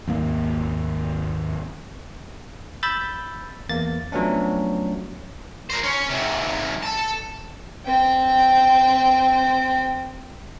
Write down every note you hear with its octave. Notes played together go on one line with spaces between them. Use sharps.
G#1 D#2 A#3
B5 E6 G6 A6
E2 A#3 A6
F3 F#3 A3 B3 C#4 D4
A#4 C5
C#4
G#2 C3
A4 A5
C4 G5